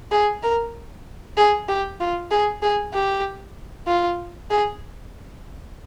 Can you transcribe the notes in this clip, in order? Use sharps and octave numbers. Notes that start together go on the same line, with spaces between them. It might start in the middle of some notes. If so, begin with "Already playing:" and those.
G#4
A#4
G#4
G4
F4
G#4
G#4
G4
F4
G#4